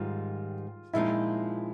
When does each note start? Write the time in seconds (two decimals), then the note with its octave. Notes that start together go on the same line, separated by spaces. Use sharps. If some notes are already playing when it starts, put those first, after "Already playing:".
Already playing: G#2 D#3 G3 F4
0.93 A#2 F3 G#3 C4 D#4 E4